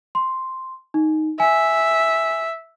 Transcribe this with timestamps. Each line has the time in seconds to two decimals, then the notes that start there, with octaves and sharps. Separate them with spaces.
0.15 C6
0.94 D#4
1.40 E5 G#5